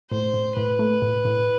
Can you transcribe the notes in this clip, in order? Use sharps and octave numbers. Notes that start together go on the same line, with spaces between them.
A2 C5
A2
A2 B4
A3
A2
A2